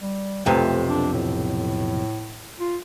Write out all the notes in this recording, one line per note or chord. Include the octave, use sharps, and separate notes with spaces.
G3
B1 F2 C3 A3
D4
A2
F4